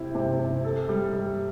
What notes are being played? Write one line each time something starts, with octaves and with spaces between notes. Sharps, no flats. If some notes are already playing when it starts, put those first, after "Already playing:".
Already playing: C3 E4
C3
C3
A4
G3
G3